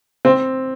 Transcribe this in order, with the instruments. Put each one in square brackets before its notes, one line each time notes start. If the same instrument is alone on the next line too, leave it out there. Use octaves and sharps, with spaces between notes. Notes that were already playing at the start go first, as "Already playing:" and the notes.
[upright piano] C4